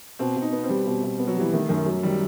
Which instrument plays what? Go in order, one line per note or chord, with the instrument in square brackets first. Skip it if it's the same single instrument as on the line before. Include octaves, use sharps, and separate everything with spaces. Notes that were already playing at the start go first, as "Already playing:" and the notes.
[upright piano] B2 [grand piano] C4
[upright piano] B2
[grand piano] D#4
[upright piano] B3
[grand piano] C4
[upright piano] G3
B2
B2
B3
[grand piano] F#3
[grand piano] E3 [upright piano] G3
[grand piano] D#3 [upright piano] A3
[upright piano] F#2 [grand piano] D#3
[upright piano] F#3
[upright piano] D#3 [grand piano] G3